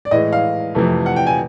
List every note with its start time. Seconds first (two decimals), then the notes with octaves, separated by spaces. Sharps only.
0.05 D5
0.11 A2 E3 G#3 D#5
0.33 F5
0.75 F2 C3 E3 A3
1.06 F#5
1.16 G5
1.27 G#5